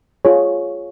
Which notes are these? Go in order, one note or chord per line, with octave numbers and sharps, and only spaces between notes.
F4 G#4 C#5